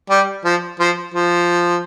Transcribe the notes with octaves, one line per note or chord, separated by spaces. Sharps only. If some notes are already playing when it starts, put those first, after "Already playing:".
G3
F3
F3
F3